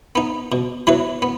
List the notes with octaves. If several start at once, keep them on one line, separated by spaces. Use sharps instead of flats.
B3 D#4
B2
F#3 B3 E4 B4
B3